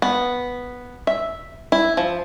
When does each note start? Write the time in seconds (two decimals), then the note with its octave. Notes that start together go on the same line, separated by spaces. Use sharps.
0.02 B3
1.07 E5
1.72 E4
1.97 F3